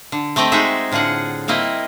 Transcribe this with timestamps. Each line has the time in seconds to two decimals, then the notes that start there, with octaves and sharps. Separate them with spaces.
0.12 D3
0.36 A3 C4 G4 D#5 G5
0.52 G#3 D#4 F#4 G#4 E5
0.92 A2 D3 F4 G#4 F#5
1.48 G3 A#3 C4 E4 D#5